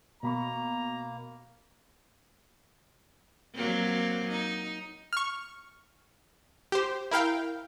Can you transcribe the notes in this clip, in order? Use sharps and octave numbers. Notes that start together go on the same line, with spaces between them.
B2 A#3 A#5 B5 C#6
F#3 A#3 C4
D#4
C#6 F6
G4 C5
E4 A#4 F5 G5